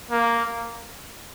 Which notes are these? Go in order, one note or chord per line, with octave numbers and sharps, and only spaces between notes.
A#3